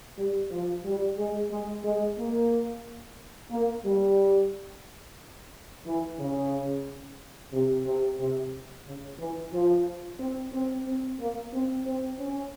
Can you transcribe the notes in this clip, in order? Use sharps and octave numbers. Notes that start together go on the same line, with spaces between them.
G3
F3
G3
G#3
G#3
G#3
A#3
A#3
G3
E3
C#3
C3
C3
C3
C#3
E3
F3
C4
C4
C4
A#3
C4
C4
C#4